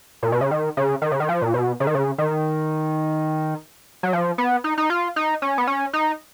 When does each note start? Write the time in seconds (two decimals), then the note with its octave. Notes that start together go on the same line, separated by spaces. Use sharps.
0.23 A#2
0.32 B2
0.41 C#3
0.51 D#3
0.77 C#3
1.02 D#3
1.12 C#3
1.20 D#3
1.29 F3
1.42 A#2
1.54 B2
1.80 C#3
1.87 D#3
1.95 C#3
2.18 D#3
4.03 F#3
4.13 F3
4.38 B3
4.64 D#4
4.78 D#4
4.90 F4
5.16 D#4
5.42 C#4
5.58 B3
5.67 C#4
5.93 D#4